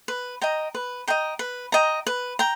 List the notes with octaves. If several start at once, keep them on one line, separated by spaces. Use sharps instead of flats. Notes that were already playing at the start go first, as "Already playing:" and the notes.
B4
D#5 G5 A#5
B4
D#5 G5 A#5
B4
D#5 G5 A#5
B4
G5 A#5